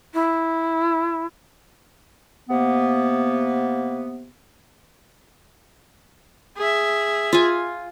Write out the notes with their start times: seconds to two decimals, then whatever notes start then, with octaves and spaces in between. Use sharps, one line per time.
0.13 E4
2.49 C3 A#3 B3
6.58 G#4 E5
7.33 F4 G#5